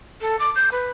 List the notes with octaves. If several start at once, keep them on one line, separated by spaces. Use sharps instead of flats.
A4
D6
G6
B4